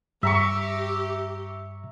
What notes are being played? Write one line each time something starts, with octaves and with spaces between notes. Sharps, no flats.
G2 G4 E5 A#5 C#6